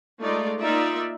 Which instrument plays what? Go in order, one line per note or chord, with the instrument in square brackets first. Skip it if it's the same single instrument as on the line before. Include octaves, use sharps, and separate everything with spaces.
[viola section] G#3 A3 D#4 F4 D5
A#3 D#4 F4 D5 E5